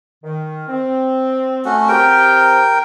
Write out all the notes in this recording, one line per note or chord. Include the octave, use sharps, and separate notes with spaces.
D#3
C4
A3 C#4 F#4
C4 G4 A#4 G5